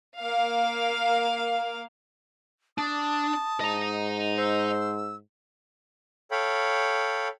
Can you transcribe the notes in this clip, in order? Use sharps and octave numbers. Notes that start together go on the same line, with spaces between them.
A#3 F5
D4 A5 D#6
G#2 D#5 A#5
C5 E6
A4 C#5 F5 G5 B5